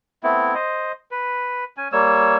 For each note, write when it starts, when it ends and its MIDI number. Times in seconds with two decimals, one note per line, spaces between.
0.23 0.54 57
0.23 0.54 59
0.23 0.54 60
0.23 0.54 64
0.55 0.92 72
0.55 0.92 75
1.11 1.64 71
1.77 1.88 61
1.77 1.88 80
1.92 2.37 55
1.92 2.37 58
1.92 2.37 73
1.92 2.37 88